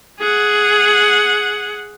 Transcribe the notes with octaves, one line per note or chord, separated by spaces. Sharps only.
G#4 F#5